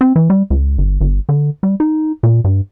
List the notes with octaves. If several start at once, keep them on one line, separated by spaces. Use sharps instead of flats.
C4
E3
G3
C#2
G1
G1
D3
G3
D#4
A#2
G2